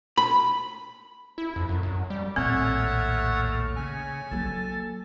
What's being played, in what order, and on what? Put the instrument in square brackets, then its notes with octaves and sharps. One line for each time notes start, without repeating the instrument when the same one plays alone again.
[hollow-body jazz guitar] B5
[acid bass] E4
F2
F#2
F#2
G3
[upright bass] A#1 D#2 [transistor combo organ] A2 F6 [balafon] C4 [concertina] C#5 E5 F#5
[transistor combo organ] C#3 [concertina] G#5
[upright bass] F#3 A#3 [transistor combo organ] A4